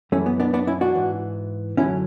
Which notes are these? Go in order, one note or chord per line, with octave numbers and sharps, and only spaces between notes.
F#2 E3 A3 C#4
B3
B3 D4
B3 D4
C#4 E4
D4 F#4
G#2 E3
F#2 D3 F#3 C#4 E4